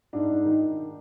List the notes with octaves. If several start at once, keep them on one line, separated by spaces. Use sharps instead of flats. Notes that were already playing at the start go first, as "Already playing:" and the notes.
G#2 D4
G#2
D#3
D#3